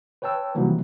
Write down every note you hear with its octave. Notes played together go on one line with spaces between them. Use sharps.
B4 C#5 G5 A5 E6
C3 D#3 E3 F#3 G3 A#3